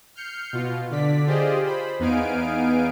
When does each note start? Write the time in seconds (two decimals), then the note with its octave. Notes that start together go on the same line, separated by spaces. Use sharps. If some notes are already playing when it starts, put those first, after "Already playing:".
0.15 F6 G6 C7 C#7
0.53 B2 F4
0.91 D3 D5 B6
1.26 F4 G4 G#4 C5 D5 D#5
1.66 C5 B5
1.99 E2 B3 D#4 F5 G#5 D7